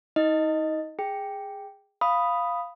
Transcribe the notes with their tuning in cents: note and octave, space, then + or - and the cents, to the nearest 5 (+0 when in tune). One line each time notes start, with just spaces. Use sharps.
D#4 +35 D#5 +0
G#4 -10 G5 +0
F5 +0 B5 +0 D#6 +0